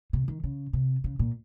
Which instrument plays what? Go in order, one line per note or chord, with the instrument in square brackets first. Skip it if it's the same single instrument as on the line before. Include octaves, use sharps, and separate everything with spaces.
[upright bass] C3
D#3
C#3
C3
C#3
A#2